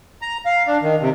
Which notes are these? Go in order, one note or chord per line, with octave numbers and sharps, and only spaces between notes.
A#5
F5
D4
D#3
C3